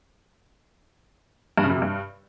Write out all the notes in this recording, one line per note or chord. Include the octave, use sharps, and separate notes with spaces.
G2
C#3
F#2
C3
G2